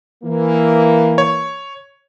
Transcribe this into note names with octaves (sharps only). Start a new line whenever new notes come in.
E3 A#3
C#5